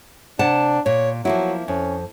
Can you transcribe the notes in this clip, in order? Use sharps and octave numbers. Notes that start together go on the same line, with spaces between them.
C3 D4 F#5 A5
A#2 C#5
F3 F#3 A#3 E4
F2 C#4